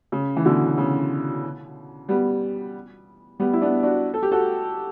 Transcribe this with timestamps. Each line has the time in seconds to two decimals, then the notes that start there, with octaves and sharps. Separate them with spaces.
0.12 C#3
0.36 E3
0.45 B2 D3
0.78 C#3
2.09 G3 B3
3.40 G3 B3
3.53 E4
3.62 B3 D4
3.83 D4 F#4
4.14 A4
4.23 G4
4.31 F#4 A4